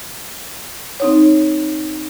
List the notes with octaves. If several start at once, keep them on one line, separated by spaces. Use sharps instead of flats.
C4 D#4 C#5